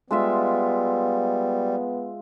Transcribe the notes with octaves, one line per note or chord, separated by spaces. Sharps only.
G3 G#3 B3 F4 E5